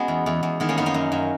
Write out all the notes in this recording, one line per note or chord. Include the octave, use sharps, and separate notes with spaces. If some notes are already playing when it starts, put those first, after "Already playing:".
Already playing: G#3 B3 C#4 F#4
E2
E2
E2
D#3 G#3 B3
A#3 C#4
F#2 B3 D#4
A#3 C#4
F#2
F#2